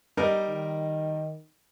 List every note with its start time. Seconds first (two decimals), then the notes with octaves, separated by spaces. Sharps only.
0.17 G3 D#4 A#4
0.49 D#3